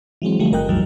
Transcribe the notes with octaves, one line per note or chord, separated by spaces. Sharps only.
E3 F#3 G#3 C4
D3 F3 G3 A3
G1 A#4 D#5 G5 F#6
A1 E2 G#2 D#3 F#3 G3